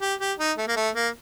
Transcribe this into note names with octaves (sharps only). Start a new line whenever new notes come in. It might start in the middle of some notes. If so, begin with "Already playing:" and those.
G4
G4
D#4
A3
A#3
A3
A#3